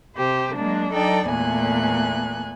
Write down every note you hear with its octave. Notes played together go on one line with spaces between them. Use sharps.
C3 G4 C5
F#3 G#3 A#3 D4
F#3 D4 D#4 A4 D5 G5
E2 A#2 A3 B3 G#5 F#6